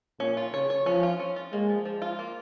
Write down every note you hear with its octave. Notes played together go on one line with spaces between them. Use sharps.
A#2 C#4
F4
C#3 C#5
C#5
F3 C#4
F4
C#4
F4
G#3 A#3
F3
F3
F4
A#3